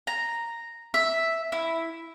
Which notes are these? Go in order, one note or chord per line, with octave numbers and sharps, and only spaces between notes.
A#5
E5
E4